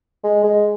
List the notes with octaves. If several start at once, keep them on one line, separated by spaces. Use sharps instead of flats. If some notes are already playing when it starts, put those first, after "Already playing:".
G#3
G#3